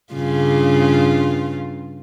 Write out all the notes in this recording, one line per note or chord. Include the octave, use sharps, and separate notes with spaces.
G2 C#3 F4